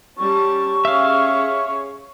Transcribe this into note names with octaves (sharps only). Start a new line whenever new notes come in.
G3 C#4 A5 C#6
C#4 G#4 C#5 E5 F5